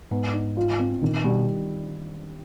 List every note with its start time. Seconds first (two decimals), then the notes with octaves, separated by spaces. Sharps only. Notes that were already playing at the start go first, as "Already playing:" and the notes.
0.11 G#2 B3
0.34 D#4
0.57 F4
0.79 C4
1.02 A#2 D#3
1.24 B2 G3